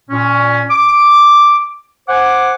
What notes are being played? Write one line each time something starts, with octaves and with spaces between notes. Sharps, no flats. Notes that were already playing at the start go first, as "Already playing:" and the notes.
A#2 C#4
D6
C5 F#5 G#5 D6